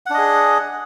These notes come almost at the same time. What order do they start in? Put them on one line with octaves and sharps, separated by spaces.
F#5 D4 D#5 G#4